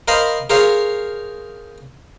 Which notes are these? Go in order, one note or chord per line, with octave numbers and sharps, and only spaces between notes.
A#4 C5 D#5 F5 B5
G#4 A#4 C5 C#5 F5